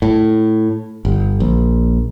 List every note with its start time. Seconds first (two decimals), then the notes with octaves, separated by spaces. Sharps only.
0.02 A2
1.05 G1
1.40 A#1